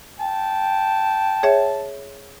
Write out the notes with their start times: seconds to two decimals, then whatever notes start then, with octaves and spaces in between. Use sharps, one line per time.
0.20 G5 A5
1.43 G#4 C#5 E5